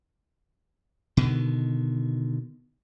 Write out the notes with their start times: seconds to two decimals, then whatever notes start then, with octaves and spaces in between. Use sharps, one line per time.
1.17 B2 D3 D#3